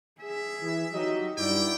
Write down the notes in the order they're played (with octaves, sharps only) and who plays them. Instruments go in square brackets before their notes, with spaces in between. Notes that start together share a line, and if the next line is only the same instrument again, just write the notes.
[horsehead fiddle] G#4 [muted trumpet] E5
[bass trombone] E3
[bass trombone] F#3 [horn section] D#4 D#5 [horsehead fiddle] F#4 G4
[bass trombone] G2 [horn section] D#4 E4 [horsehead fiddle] F#4 D5 [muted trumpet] G5